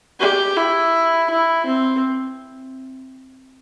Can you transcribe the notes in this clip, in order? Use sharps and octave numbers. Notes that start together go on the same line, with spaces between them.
G4
E4
E4
C4